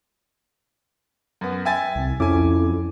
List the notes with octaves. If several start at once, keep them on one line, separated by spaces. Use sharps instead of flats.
F#2 B3
E5 G5 G#5 A6
C2
F2 C#4 E4 A4 G#5 D6